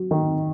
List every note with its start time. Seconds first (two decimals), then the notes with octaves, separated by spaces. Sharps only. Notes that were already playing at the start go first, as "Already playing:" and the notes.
Already playing: F#3
0.11 D#3